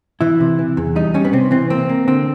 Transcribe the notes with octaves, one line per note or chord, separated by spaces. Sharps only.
E3 E4
C3
E3
E2
G3 D#4
G3 C#4
B3
C3 C4
E3 C4
A#3 C4
A#3
D3 C4